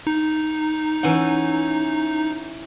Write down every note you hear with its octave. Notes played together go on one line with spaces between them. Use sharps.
D#4
E3 C#4 F#5